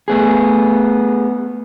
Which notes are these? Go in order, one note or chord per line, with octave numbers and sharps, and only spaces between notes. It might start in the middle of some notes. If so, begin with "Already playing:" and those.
A3 B3 G#4